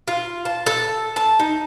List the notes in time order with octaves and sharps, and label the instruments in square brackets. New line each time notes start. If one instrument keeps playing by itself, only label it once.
[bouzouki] F4
A5
A4
A5
D#4